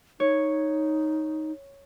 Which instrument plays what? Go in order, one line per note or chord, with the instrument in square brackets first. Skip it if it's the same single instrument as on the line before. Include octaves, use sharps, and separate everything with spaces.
[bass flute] D#4 [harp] C#5